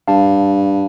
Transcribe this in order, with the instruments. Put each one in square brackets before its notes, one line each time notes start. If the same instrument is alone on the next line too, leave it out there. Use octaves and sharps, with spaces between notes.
[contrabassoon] G2 [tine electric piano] F5 A5